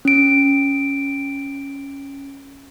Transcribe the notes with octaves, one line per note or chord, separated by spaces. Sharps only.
C#4 D7